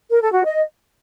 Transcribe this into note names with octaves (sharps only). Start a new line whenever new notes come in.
A#4
A4
F#4
D#5